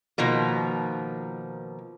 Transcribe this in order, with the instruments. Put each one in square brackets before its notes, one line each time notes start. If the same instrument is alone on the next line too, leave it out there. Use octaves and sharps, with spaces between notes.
[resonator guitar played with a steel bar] B2 D#3 F3 A#3